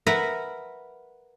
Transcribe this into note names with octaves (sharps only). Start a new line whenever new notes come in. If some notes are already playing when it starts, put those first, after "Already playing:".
A#4 B4 E5 F#5